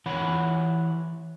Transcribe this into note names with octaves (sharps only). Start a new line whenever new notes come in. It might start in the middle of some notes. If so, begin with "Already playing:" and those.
E3 C#5 F#5 B5